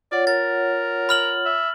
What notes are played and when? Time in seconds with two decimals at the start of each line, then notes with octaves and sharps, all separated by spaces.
0.12 F4 C#5 D5 F#5
0.27 A#4 A6
1.09 B5 F6 F#7
1.45 E5